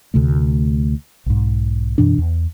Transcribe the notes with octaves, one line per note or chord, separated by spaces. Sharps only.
D2 C3 A3
B1 G#2
F#2 B2 E3 D4
E2